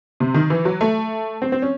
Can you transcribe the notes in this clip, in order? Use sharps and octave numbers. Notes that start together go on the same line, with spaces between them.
C3
D#3
E3
F#3
A3
C4
C4
C#4